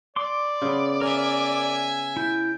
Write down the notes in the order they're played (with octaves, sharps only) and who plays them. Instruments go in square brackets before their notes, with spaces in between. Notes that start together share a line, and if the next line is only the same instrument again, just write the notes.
[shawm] D5 [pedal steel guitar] C6 D6
[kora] C#3 B3
[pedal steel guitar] A#4 [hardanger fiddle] E5 G#5
[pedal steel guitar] E4 [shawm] G5